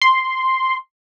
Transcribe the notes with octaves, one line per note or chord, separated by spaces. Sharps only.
C6